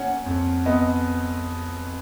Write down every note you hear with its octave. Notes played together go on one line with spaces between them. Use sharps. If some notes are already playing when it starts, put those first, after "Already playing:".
Already playing: A#3 C#4 F#5
F2
B3 D#5